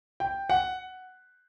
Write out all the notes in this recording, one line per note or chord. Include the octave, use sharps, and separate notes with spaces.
G5
F#5